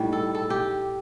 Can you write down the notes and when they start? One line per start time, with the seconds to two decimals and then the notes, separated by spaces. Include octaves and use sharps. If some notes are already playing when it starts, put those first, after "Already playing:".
Already playing: A2 G3 D#4
0.13 A4
0.35 A4
0.50 G4